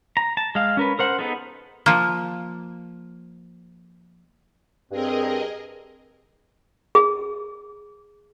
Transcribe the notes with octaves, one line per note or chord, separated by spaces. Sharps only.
A#5
A5
G#3 F5
C#4 A#4 B4
A#4 C5 F#5
B3 D#4 G#4 A4
F3 A#3
G2 C4 G#4 A#4 D#5
G#4